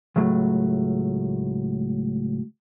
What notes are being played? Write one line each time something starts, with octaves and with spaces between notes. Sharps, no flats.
C#2 A2 F#3 A3